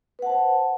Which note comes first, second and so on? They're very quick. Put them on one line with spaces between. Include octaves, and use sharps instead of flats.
B4 F#5 A5 C5